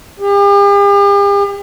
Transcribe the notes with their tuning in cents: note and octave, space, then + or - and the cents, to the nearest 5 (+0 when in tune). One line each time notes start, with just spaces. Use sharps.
G4 +45